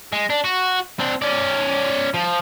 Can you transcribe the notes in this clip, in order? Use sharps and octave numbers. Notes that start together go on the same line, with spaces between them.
G#3
D4
F#4
C4 D4
C#4 D5
F3